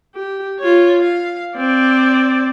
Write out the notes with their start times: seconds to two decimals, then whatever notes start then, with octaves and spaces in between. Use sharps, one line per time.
0.15 G4
0.59 F4 C#5
1.02 F5
1.57 C4 D5